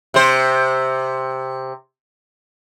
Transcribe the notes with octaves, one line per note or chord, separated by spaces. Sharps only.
C3 C5